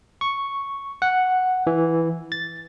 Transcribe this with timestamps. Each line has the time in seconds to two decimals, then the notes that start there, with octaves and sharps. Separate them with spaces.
0.21 C#6
1.02 F#5
1.67 E3
2.32 A6